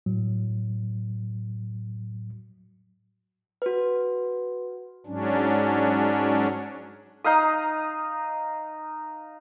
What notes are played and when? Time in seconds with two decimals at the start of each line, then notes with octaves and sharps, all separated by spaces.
0.06 A2 F#3
3.62 F#4 B4
5.06 G#2 F#3 C#4 D4
7.24 D#4 F5 D#6